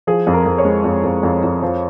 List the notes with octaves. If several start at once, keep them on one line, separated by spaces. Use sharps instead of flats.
F3 G#4
F2
A#4
F2
C#5
G#3
F2
F2
F2
F2
F3